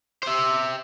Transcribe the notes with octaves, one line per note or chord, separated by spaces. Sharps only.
C5 E5